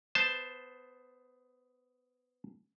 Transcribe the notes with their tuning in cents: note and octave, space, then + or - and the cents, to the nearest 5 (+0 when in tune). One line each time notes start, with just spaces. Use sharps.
B3 +15 C5 +0 A5 +0